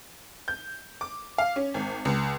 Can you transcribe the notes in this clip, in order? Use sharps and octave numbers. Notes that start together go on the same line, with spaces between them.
G6
D6
F5
C#4
G#1
C#2